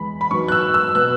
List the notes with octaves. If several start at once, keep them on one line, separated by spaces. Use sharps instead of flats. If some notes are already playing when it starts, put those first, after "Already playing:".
Already playing: E2 E3 G#3 B5
B5
G#2 F#3 B3 C#6
F#6
E6
E6
B2 B3 F#6